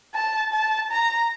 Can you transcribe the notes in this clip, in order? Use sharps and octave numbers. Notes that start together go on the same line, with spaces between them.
A5
A5
A#5